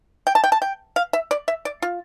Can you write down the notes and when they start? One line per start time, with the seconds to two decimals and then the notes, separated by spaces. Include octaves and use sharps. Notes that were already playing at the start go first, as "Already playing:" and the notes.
0.27 G5
0.35 A5
0.44 G5
0.52 A5
0.62 G5
0.96 F5
1.13 E5
1.31 D5
1.48 E5
1.65 D5
1.82 F4